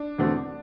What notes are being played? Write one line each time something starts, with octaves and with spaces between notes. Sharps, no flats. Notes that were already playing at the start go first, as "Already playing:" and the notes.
Already playing: D4
E2 D3 A3 C4 F#4